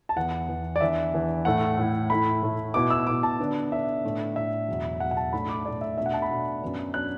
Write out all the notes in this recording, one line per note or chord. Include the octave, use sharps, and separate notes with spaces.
A5
E2 E3 B3 F#5
E2 E3 B3
D5
E2 E3 D4 E5
E2 E3 D4
A2 A3 E4 F#5
A2 A3 E4
A2 A3 E4 B5
A2 A3 E4
B2 B3 E4 D6
E6
B2 B3 E4 D6
A5
D3 B3 D4
D3 B3 D4 E5
A2 A3 D4
A2 A3 D4 E5
E2 B2 F#3
E2 B2 F#3 F#5
F#5
A5
A2 A3 D4 B5
D6
A2 A3 D4 D5
E5
B2 A3 D4 E5
F#5
A5
B5
B2 A3 D4
F#2 F#3 B3 D4
F#3 B3 D4 F#6